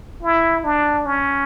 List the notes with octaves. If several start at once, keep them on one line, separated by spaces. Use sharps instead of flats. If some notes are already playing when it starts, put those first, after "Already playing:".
E4
D4
C#4